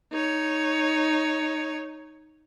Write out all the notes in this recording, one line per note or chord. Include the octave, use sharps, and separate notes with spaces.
D#4 C#5